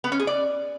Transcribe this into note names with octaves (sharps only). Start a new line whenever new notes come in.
B3
C#4
G#4
D5